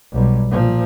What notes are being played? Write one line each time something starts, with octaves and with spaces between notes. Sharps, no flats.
B1 G3
A#2 F3